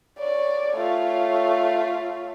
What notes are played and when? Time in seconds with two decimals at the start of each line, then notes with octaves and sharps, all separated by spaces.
0.19 C#5 D5
0.75 A3 F4